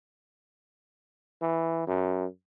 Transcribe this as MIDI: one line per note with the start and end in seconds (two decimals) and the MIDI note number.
1.42 1.84 52
1.87 2.26 42